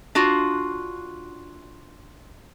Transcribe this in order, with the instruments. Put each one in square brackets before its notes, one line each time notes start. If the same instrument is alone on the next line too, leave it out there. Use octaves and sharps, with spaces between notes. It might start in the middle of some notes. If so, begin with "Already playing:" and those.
[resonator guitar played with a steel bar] D4 F4 F#4